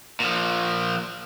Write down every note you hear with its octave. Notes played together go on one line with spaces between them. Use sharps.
A#2 F3